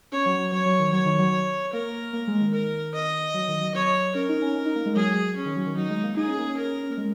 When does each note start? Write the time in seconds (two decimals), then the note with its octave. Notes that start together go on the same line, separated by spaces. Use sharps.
0.12 C#4 C#5
0.26 F#3
0.38 F#3
0.52 F#3 C#5
0.66 F#3
0.79 D#3
0.93 F#3 C#5
1.06 D#3
1.19 F#3
1.73 A#3 A#4
2.13 A#3
2.27 G#3
2.41 D#3
2.53 A#4
2.94 D#5
3.34 F#3
3.48 D#3
3.61 F#3
3.75 F#3 C#5
4.15 C#4 A#4
4.29 D#4
4.42 C#4
4.55 C#4
4.66 D#4
4.75 A#3
4.85 G#3
4.96 F#3 G#4
5.36 C#4
5.45 D#3
5.56 F#3
5.66 D#3
5.77 F#3 D#4
5.90 G#3
6.03 A#3
6.16 D#4 G#4
6.27 C#4
6.38 A#3
6.49 C#4
6.57 A#4
6.83 C#4
6.90 A#3
6.97 G#3